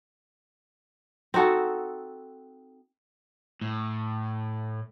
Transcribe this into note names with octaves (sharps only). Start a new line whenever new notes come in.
C4 D#4 F#4 A4
A2